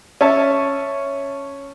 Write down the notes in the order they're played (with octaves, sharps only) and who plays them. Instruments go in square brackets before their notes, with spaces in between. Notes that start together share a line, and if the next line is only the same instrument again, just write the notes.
[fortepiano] C#4 E5 A5